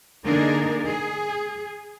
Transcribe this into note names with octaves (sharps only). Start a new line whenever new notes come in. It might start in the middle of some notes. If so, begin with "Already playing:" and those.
D3 A#3 D4 D#4 G#4 A#4
G#4